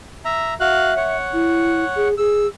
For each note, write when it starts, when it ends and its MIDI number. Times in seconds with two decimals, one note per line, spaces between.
0.25 0.54 76
0.25 0.54 82
0.60 0.94 66
0.60 1.17 76
0.60 0.94 77
0.60 0.94 90
0.97 2.08 73
0.97 2.08 78
1.33 1.84 64
1.96 2.17 68
2.18 2.46 68
2.18 2.47 88